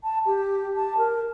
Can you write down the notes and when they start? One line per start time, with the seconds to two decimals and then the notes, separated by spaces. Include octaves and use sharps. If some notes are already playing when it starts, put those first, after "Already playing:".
0.04 A5
0.26 G4
0.76 A5
0.98 A#4